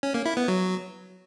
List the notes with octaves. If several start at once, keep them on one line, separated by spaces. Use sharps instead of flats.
C#4
A#3
E4
B3
F#3